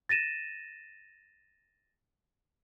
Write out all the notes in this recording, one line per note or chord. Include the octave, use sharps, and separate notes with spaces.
A6 A#6 D#7 E7